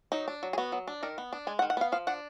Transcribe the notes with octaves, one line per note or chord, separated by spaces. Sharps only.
F#3 D#4
D4
F#3
G#4
B3 F#4
F#3
D4
D#3 A#4
B3
D4
G#3 G#5
F#5
D#3
F#5
B3 F5
F3 F5
D4 F#5